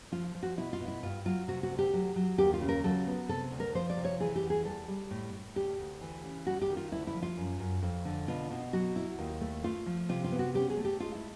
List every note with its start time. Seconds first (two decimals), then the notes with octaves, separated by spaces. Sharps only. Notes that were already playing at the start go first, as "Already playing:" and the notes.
0.12 F3 F4
0.35 F3
0.43 F#4
0.57 B2 E4
0.73 F4
0.80 B2
0.88 E4
1.03 G2 F4
1.26 F#3 F4
1.48 C3 F#4
1.63 F#4
1.71 D2
1.79 G4
1.94 F#3
2.16 F#3
2.38 D#2 G4
2.54 F4
2.61 C#3
2.69 A#4
2.84 F#3 A4
3.07 B3
3.29 C3 A4
3.52 D2
3.60 A#4
3.75 F3 C5
3.90 D5
3.97 C3
4.05 C#5
4.20 E3 G#4
4.36 G4
4.42 E2
4.50 G#4
4.65 G3 A4
4.88 G3
5.11 A2
5.33 A2
5.56 D2 G4
5.78 D2
6.01 E3
6.23 C#3
6.46 G3 F#4
6.61 G4
6.70 D#3
6.77 F4
6.92 D2 E4
7.07 E4
7.14 F3
7.22 F4
7.38 F#2
7.60 F#2
7.83 F2
8.05 D3
8.28 B2 F4
8.51 B2
8.73 F#3 F#4
8.96 E4
9.19 D#2
9.41 A3
9.64 A3 F4
9.86 F3
10.09 C3 F4
10.24 F4
10.32 B3
10.39 F#4
10.54 C#4 G4
10.70 G#4
10.77 A3
10.85 G4
11.00 G#3 F4
11.15 E4